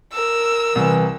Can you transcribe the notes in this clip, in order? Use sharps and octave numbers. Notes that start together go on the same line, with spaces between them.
A#4 E6
C2 E3